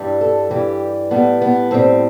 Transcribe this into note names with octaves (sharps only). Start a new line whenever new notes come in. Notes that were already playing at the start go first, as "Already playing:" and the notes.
Already playing: G2 E3 G3
A4
G2 E3 G3 G4
A2 G3 B3
B3
A2 G3 C4